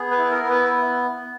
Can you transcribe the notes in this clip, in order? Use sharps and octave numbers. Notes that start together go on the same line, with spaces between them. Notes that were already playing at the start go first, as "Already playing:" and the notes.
Already playing: B3 G#4
B4
E4
A#4
B3
B4